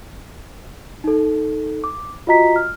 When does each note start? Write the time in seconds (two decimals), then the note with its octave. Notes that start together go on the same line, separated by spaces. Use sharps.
1.04 D#4 A4
1.84 D6
2.27 F4 F#4 D#5 A#5 B6
2.56 F6